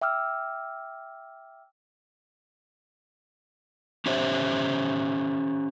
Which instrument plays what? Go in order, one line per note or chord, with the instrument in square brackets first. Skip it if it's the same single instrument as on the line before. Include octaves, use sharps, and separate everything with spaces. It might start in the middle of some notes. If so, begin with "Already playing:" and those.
[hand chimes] E5 G5 D6 E6 F6
[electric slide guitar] C#4 G4 C5 C#5 E5